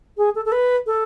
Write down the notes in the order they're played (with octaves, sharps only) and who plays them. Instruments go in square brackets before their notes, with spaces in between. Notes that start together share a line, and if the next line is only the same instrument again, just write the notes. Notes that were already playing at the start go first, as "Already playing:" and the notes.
[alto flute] G#4
A4
A4
B4
A4